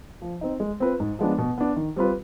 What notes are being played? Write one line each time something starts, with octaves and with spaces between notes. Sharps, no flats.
F3
C4 D#4
G#3
C4 F4 B4
G#2
F3 G#3 B3 D4
B2
B3 D4
D#3
G3 C4 F4 B4